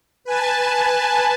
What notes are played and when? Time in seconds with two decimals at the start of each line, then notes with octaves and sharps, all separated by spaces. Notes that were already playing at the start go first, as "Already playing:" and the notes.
0.24 B4 G#5 A5